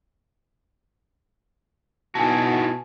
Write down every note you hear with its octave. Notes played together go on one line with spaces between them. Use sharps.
B2 D#4 E4 F#4 G#5 A5